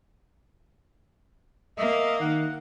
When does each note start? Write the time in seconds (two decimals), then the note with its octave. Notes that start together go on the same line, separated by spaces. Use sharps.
1.78 A#3 D#5 E5
2.21 D#3 F#5